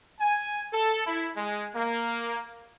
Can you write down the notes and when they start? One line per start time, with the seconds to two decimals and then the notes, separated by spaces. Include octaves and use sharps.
0.19 G#5
0.72 A4
1.05 E4
1.36 G#3
1.74 A#3